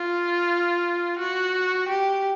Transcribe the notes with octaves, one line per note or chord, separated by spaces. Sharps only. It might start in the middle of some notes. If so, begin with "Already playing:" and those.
Already playing: F4
F#4
G4